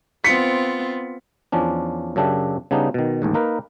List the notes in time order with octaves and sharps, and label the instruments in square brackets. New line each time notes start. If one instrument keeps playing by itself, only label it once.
[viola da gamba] B3 C4 F4 [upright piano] B6 C#7
[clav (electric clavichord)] E2 F3 C#4 D4
F#2 C#3 D4 G4 E5
C#3 G3 B3 D4 D#4
B2 D#3
A1 D#2 G#2
A#3 D#4 A#4 B4